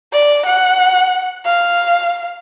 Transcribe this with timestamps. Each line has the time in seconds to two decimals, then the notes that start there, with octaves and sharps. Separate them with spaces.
0.12 D5
0.46 F#5
1.45 F5